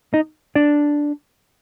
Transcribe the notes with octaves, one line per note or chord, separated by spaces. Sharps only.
D#4 D#5
D4 D5